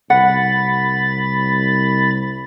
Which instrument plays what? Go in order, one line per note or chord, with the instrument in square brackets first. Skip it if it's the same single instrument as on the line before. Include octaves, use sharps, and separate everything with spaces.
[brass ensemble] C2 [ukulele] F#5 [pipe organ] B5 A6